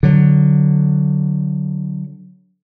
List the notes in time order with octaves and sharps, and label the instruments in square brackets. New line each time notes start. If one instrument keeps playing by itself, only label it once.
[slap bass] D3 F#3